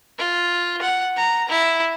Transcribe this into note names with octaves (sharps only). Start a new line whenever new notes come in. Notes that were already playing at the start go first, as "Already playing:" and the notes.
F4
F#5
A#5
E4